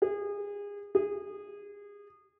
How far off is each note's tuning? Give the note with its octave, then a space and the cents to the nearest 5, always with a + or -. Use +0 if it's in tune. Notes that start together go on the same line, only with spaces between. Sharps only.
G#4 -30
G#4 -25